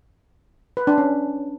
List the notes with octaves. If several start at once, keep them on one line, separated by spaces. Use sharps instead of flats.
B4
D4
C#4